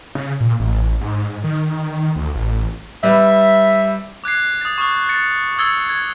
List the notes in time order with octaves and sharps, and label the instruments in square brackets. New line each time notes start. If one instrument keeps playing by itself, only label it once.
[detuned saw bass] C#3
A#2
A1
G#2
D#3
D2
A1
[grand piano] G3 B4 [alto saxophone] E5
[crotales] D6 F#6 G#6 C7
D#6 A6
C#6 D#6 F6
A6 C#7
D#6 E6 G#6 A6 C#7 G7
G#6